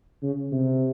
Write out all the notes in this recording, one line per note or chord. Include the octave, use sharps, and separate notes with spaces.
C#3
C3